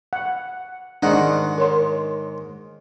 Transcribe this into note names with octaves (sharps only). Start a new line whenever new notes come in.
F#5
G#2 D#3 D4 D#4 F#5
A#4 C#5 C6